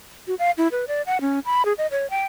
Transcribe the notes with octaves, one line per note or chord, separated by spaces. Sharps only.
F#4
F5
E4
B4
D5
F#5
C#4
B5
G#4
D#5
C#5
G5